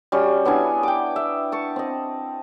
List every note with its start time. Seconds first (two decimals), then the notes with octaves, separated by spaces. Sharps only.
0.12 G3 C#4 F#4
0.45 B3 D4 E4 G#5
0.83 G5 D6
1.16 E5
1.52 A5 C#6
1.76 C4 D#5